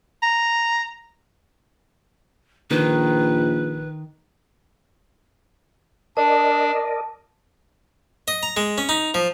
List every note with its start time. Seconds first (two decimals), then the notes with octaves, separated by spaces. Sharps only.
0.23 A#5
2.71 A#1 D#3 B4
6.17 D4 A#4 D5 D#5 A5
8.28 D#5
8.43 A#5
8.57 G#3
8.78 C#4
8.89 D#4
9.14 F3